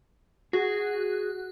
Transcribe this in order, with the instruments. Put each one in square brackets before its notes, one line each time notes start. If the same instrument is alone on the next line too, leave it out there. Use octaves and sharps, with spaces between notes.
[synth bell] F#4 [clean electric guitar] G#4